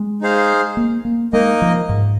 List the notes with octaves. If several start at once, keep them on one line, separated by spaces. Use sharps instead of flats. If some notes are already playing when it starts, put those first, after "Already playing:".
Already playing: G#3
D#4 G#4 C5 F5
A#3
A#3
G#3 A#3 D#4 A#4 D#5
F3
G#2